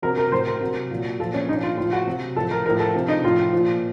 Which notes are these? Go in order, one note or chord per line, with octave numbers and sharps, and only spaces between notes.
C3 F#3 A#4
A#4
A2 F#3 C5
A#4
C3 F#3
A#2 F#3
A#2 F3 A4
C#4
A#2 F3 D#4
F4
A2 F3 F4
F#4
C3 F#3
A2 F3 A4
A#4
A2 F3 A#4
A4
C3 F3
D#4
A2 F3 F4
A#2 F3